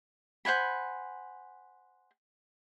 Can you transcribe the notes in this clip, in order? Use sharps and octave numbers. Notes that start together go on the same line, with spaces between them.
C5 F#5 G#5 B5